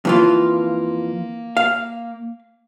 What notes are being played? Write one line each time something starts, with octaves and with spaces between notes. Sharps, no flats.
F2 E3 A#3 F4
F5